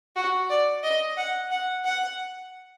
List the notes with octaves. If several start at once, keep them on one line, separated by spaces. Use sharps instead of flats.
F#4
D5
D#5
F#5
F#5
F#5